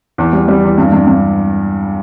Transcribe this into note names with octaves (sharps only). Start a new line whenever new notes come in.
E2
G3
G3
E2
G2
G2
G2